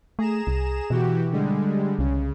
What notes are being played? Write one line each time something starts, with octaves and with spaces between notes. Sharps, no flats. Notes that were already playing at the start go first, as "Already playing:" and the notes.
A3 G#4 A#5 E7
C2
B2 E3 F#4 G4
D3 G3 G#3
C2 C#3